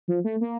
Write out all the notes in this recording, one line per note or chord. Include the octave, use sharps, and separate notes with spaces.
F3
A3
A#3